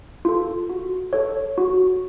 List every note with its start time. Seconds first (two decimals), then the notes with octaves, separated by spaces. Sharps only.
0.25 F4 A4
0.70 F#4
1.13 A4 C#5
1.58 F#4